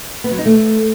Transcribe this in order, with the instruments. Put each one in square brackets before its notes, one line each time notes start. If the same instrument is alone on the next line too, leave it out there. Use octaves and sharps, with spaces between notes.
[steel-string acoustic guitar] B3
F#3
D#4
A3